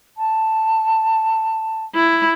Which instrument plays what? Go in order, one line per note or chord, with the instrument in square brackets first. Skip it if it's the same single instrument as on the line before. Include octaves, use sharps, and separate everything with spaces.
[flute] A5
[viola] E4